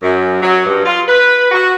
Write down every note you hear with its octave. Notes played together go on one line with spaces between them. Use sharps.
F#2
F#3
G2
F4
B4
F#4